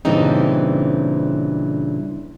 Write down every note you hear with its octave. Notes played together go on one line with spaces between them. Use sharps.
G2 A#2 C#3 E3 C4 D#4